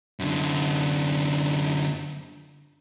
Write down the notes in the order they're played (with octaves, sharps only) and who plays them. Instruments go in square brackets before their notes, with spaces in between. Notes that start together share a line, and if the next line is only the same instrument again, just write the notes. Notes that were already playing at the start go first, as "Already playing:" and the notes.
[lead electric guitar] F#2 D3